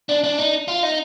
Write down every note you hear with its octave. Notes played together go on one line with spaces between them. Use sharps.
D4
D4
D#4
F4
D#4